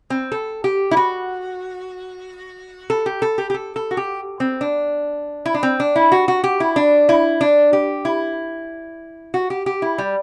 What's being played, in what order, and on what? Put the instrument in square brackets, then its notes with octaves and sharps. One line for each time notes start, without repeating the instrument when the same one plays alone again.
[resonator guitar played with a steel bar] C4
A4
G4
E4
F#4
A4
G4
A4
G4
G4
A4
A4
F#4
G4
C4
D4
E4
D4
C4
D4
E4
F#4
F#4
G4
E4
D4
E4
D4
G4
E4
F#4
G4
G4
E4
G3